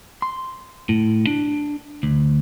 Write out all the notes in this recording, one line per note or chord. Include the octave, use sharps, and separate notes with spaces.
C6
A2
D4
D2